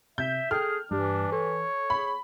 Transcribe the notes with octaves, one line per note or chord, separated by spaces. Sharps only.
C3 E5 G6
G#4 A4 G5 F6
G2 E3 G3 D4
A4 C#5
G#4 B5